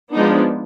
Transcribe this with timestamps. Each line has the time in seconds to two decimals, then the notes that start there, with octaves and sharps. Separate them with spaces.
0.14 F3 G#3 B3 D4 D#4